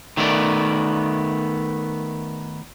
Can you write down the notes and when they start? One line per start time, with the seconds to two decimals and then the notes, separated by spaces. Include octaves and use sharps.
0.17 D#3 A3 B3 D5